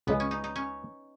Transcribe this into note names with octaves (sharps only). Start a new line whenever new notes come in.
C#2 C#3 G#3 B3
C#4
D#4
D#4
C#4